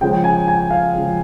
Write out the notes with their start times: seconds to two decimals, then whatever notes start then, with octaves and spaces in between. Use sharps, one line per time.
0.01 C#3 F3 G#3 G5
0.24 G#5
0.48 G#5
0.71 F5
0.94 C#3 F3 G#3